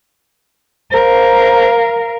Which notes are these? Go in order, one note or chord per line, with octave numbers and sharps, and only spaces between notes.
A#4 C5 F5